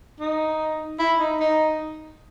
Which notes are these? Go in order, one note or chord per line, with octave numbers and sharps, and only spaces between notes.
D#4
E4
D#4
D#4